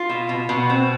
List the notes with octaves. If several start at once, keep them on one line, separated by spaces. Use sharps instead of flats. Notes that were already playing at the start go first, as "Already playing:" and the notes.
Already playing: F4
B2
B2
B2
C4